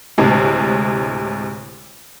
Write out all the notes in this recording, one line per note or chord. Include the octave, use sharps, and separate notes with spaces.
D2 A2 C3 G#3